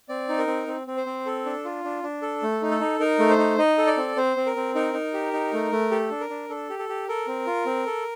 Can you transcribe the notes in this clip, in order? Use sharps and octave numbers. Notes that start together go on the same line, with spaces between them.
C4 D5
D#4
A#4
C4
C4
C4
C5
C4
A4
D4
F4
D4
D4
A4
A3
D#4
A4
D#4
D#4 A#4
A3
C5
D#4
D#4 D#5
A4
D5
C4
C4 C5
C4
A#4
C4
D#4 A#4
D#4
G4
D#4
A3
A3
G4 A4
D4
A#4
D4
D4 A4
G4
A4
G4
A4 A#4
C4
F4
C4
A4